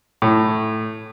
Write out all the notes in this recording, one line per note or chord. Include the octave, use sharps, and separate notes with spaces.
A2